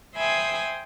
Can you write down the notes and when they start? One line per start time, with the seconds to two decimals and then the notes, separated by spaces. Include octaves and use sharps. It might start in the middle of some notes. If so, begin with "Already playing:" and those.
0.15 C5 E5 G5 G#5 B5 D#6